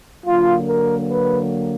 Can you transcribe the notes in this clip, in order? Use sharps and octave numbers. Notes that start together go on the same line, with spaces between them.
D3 F#3 A#3 F4
A#4
B4